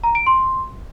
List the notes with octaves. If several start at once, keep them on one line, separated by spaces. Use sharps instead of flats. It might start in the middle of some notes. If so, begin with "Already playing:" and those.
A#5
D7
C6